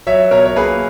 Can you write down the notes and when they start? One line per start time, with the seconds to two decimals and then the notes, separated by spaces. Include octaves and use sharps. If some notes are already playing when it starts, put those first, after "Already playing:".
0.07 F#3 C#5 E5
0.31 B2 A#4 C#5
0.45 C#5
0.56 A#3 G#4 B4